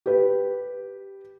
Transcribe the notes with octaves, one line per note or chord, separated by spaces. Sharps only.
G4 B4